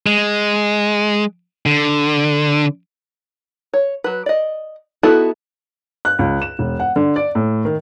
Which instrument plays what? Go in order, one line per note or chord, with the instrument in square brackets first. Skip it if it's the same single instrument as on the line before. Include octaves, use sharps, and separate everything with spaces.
[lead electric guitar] G#3
D3
[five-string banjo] C#5
F#3 B4
D5 D#5
B3 D#4 E4 F#4 A4
[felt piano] F#6
C#2
E7
E1
F#5
D3
D5
A2
D#3